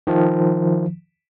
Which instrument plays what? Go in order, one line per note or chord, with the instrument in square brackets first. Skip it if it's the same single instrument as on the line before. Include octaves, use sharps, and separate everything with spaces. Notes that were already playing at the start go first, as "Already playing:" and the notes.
[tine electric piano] D#3 F3